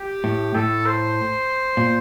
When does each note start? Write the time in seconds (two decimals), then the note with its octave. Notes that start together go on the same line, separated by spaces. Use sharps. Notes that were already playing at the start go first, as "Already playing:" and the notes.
Already playing: G4
0.24 A2
0.55 A2 A4
0.86 C5
1.77 A#2